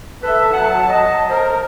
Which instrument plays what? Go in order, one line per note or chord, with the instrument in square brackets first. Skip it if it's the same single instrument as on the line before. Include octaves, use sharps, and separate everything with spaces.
[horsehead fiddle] A4 E5 [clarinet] B4
[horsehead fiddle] F#3 A5 [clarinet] F#5
[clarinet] D#5
[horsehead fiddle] A#4 [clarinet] C5